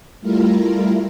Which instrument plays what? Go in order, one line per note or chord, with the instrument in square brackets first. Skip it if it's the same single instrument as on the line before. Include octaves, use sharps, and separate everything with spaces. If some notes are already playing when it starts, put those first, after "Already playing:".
[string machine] G3 A3 E4 F4 A#4